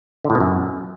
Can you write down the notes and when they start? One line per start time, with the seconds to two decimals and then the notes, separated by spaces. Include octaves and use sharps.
0.24 D3
0.30 A2
0.35 B2
0.40 F#2